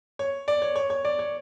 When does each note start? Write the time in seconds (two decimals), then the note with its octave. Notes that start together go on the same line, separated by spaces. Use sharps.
0.19 C#5
0.48 D5
0.62 C#5
0.76 C#5
0.90 C#5
1.05 D5
1.19 C#5